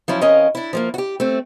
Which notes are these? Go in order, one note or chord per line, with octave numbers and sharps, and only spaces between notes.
F3 F#3 C#4 E4
F2 C#4 A#4 D#5 F5
D4 E4
F3 A3 A#3
F#4 G4
A3 C4